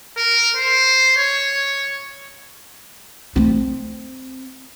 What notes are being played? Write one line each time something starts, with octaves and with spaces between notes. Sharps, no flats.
A#4
C5
C#5
A3 C4